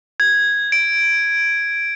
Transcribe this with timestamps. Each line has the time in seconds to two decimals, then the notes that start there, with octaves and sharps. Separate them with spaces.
0.20 G#6
0.72 D7